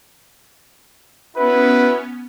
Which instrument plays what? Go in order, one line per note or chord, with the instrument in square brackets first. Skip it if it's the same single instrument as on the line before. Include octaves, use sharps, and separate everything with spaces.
[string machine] B3 C#4 [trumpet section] E4 F#4 B4